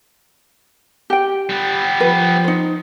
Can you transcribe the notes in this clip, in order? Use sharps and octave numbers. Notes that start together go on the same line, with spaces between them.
G4 G5
G3 B3
F3 B4
D#4 C5